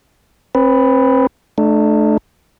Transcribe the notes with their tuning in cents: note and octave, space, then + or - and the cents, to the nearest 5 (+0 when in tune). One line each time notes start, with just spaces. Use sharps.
C4 +35 B4 +0
A3 -25 D4 +30